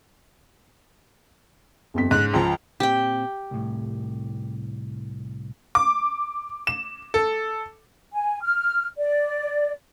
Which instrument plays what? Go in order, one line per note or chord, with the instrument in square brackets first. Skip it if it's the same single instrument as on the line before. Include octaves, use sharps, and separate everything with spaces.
[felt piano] G1 F2 B6
[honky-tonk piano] G#2 [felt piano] C#3 [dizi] F#6
[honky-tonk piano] C#2 F3 [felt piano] F4 [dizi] A#5
[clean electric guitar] A#2 C4 [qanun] G4 G5
[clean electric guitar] C2 A2
[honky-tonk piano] D6
E7
A4
[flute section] G#5
F6
D5